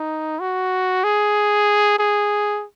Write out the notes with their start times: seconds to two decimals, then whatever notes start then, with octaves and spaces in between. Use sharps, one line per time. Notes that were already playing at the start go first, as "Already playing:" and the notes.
Already playing: D#4
0.41 F#4
1.04 G#4
1.99 G#4